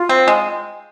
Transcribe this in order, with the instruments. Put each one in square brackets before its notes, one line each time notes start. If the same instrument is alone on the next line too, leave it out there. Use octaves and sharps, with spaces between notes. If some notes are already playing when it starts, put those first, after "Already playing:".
Already playing: [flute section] F4
[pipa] C4
G#3